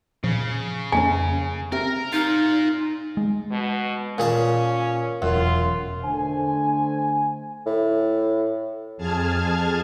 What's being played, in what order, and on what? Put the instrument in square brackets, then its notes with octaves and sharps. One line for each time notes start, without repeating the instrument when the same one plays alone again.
[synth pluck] A#2 F3 [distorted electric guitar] C#3
[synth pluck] F2 A#3 C#4 [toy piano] G#5
[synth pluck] C4 G4 E5 [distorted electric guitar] A#4
[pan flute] D#4 [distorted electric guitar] F4 A#4
[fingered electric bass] G#3
[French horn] B2
[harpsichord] A#2 G#4 A5 [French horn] C#4
[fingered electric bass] E1 [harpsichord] F#2 [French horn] F4
[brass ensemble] D3 A3 C5 G#5
[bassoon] A2
[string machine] F2 G#4 A5 F6 G#6